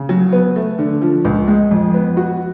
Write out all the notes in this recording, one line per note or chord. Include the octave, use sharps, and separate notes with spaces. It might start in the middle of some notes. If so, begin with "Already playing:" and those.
Already playing: C#3
F#3
B3
A3
D3
F3
C#2
G#3
F2
B3
F#4